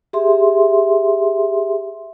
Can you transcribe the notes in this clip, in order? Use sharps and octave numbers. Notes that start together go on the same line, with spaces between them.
G4 G#4 E5 C6